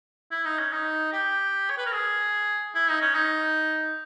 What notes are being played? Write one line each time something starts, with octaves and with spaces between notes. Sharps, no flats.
E4
D#4
C#4
D#4
G4
C#5
B4
A#4
G#4
E4
D#4
C#4
D#4